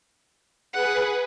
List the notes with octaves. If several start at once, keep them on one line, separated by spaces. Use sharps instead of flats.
G#4 B4 F#5